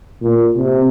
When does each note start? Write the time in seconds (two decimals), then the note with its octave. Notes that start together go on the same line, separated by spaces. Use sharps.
0.22 A#2
0.57 C3